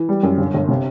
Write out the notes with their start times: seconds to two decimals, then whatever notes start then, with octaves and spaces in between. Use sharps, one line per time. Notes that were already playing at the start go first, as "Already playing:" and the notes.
Already playing: E3
0.09 G3
0.23 F#2
0.38 G1
0.54 G1
0.68 C3